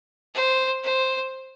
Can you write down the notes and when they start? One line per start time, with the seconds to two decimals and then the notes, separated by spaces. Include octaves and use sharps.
0.34 C5
0.84 C5